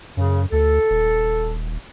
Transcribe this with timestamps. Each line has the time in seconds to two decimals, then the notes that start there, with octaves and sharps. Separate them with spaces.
0.17 F#2 C#3
0.52 D2 A4
0.90 D#1